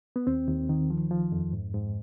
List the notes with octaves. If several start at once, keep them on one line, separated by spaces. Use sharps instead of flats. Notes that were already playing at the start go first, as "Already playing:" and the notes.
B3
D#2 C4
D#2
D#3
F3
F3
F2
G#2
G#2